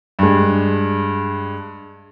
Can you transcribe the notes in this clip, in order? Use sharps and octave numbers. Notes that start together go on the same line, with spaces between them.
G2 G#3